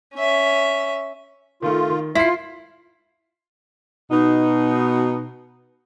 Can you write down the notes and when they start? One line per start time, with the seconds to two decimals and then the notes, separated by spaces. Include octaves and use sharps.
0.15 C#4 E5
1.62 D#3 A3 F4
1.89 D#3
2.15 E4 F4 B6 C7
4.11 B2 D#4